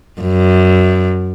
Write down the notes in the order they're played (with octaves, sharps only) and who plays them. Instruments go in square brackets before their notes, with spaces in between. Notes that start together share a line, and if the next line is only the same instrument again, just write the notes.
[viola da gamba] F#2